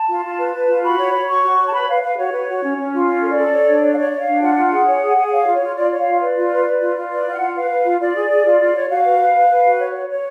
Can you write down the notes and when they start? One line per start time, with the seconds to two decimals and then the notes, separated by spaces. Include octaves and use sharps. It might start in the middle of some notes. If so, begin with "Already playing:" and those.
Already playing: A5
0.09 F4
0.24 F4
0.39 B4
0.54 B4
0.69 F4
0.84 F#4 B5
0.99 C#5
1.14 C#5
1.28 F#4 C#6
1.43 F#4
1.59 C#5
1.68 A5
1.73 B4 B5
1.88 B4 F5
2.03 B4 F5
2.18 F#4 C#5
2.33 B4
2.48 F#4
2.63 C#4
2.78 C#4
2.93 F4
3.08 C#4
3.22 A4
3.30 D5
3.38 A4
3.52 C#5
3.68 D4
3.82 C#5
3.92 F5
3.97 C#5 D5
4.12 C#5
4.20 F5
4.27 D4
4.42 F4 F#5
4.56 F4
4.72 G#4
4.87 C#5
5.02 G#4
5.17 G#4
5.27 F#5
5.32 C#5 F5
5.47 F4
5.54 C#5
5.62 F4
5.76 F4 D5
5.91 C#5
5.99 F5
6.06 F4
6.21 B4 D5
6.36 F4
6.51 B4
6.66 B4
6.81 F4
6.96 F4
7.11 B4 D5
7.26 F4
7.34 F#5
7.41 F4
7.56 B4 F5
7.70 B4
7.85 F4
8.00 F4 D5
8.16 G#4
8.30 G#4
8.45 F4
8.61 F4
8.75 C#5
8.90 F#4 F5
9.05 B4
9.20 B4
9.34 B4
9.49 B4
9.65 F#4
9.80 C#5
9.95 C#5
10.09 C#5